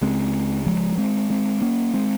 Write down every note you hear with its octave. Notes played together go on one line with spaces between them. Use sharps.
C#2 C#3 G#3 C4
F3 G#3
G#3 C4
G#3 C4
A#3 C#4
G#3 C4